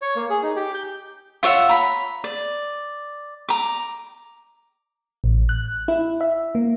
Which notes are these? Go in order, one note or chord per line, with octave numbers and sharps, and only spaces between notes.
C#5
A#3
G#4
D#4
G4
G6
F4 C#5 E5 F#5
A#5 B5
D5
A#5 D6
A1
F#6
E4
E5
A#3